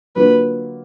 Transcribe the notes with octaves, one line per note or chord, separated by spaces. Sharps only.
D3 F#3 A#3 F4 B4